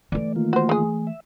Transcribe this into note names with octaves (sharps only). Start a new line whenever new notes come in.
E3 A3 D5
D#3 A#3 F4
F#4 C5
G#3 G#4
E5